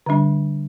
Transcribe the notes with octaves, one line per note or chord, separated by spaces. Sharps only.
D3 G3 D4